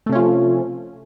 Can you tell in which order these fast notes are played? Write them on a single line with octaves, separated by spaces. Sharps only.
A3 C3 C#4 F4 F3